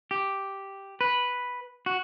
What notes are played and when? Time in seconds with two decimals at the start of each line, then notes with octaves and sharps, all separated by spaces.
0.11 G4
1.01 B4
1.86 F#4